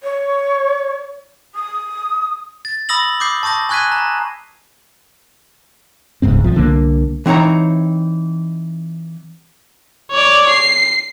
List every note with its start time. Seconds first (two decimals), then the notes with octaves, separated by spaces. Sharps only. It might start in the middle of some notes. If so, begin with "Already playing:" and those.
0.03 C#5
1.55 D#6
2.65 A6
2.89 B5 D#6 E6 A#6 F#7
3.20 D6 D#6 G6 C7
3.43 A5 C#6 D#6 G6 A#6
3.69 G#5 C#6 F#6 G#6 B6 D#7
3.92 A#5
6.22 D1 C#2 G#2 C4
6.40 A#1 F3
6.55 C2 D3 G3 A#3
7.26 E3 C4 D#4 C#5 A#5
10.11 C#5 D5
10.49 C7